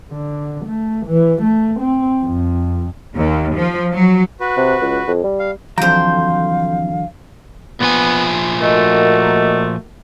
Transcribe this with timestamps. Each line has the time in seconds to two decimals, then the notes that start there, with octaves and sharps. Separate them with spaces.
0.11 D3
0.66 A3
1.06 E3
1.42 A3
1.80 C4
2.24 F2
3.17 D#2
3.56 F3
3.92 F#3
4.40 F#4 B4
4.57 C3
4.82 C#2
5.07 F2
5.24 G3
5.39 F5
5.78 F2 D3 E3 F#3 C5 F5 G5 A#5
7.80 A#2 F3 B3 G#5
8.62 A3 A#3 F#4 A#4 D#5